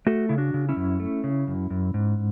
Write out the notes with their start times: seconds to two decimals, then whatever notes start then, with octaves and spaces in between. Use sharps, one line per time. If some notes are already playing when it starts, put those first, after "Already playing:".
0.06 A3 F#4 A4
0.29 C#3 E4
0.38 D4 F#4
0.54 C#3
0.69 C#4 E4
0.77 F#2
1.00 A3
1.24 C#3
1.47 F#2
1.70 F#2
1.94 G#2